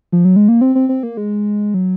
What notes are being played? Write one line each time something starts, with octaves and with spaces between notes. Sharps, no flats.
F3
F#3
G#3
A#3
C4
C4
C4
A#3
G#3
F#3